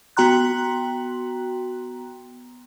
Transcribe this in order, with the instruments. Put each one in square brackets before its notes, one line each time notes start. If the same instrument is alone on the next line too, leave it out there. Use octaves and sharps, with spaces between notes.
[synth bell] B3 F#4 G5 A#5 C6 F#6